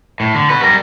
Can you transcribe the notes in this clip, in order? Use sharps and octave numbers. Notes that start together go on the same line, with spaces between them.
A2
D3
F#4 B4
G3 A#4